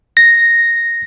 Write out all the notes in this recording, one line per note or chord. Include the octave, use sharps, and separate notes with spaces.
A#6